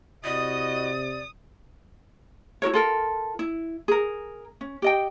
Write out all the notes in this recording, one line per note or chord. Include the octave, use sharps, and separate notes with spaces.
C3 E4 F#4 D5 D#5 D#6
E4 F#4 A#4 C#5
F4 A4 A#4
E4
G#4 A#4
C#4
G4 D#5 G5